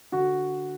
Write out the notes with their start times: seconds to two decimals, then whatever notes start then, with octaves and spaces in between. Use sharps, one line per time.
0.12 D3 F#4